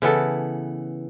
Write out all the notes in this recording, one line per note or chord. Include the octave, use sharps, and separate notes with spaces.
C#3 E3 B3 A4